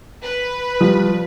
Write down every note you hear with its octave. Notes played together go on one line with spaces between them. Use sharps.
B4
F3 G3